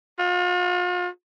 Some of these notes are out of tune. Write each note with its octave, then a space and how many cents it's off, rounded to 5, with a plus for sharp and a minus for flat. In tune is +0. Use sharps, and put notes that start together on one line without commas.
F4 +40